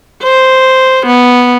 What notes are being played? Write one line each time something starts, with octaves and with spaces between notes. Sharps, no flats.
C5
B3